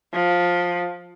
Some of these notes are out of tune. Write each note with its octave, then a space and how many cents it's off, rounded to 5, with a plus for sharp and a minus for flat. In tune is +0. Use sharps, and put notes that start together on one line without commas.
F3 +15